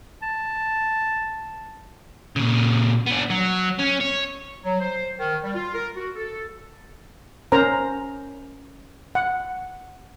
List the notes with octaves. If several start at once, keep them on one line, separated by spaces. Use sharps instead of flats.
A5
A#2 C#3
B3 D4
F#3
C#4
C#5
F#3
C5
D#3
G3
F4
A#4
F#4
A4
C#4 A#4 C5 A#5
F#5